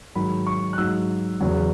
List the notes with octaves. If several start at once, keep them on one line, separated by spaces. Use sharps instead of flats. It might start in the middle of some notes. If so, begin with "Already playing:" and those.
G#2 D#3 F#3 B5
C#6
F#6
G#2 F#3 E6
E2 C#3 F#3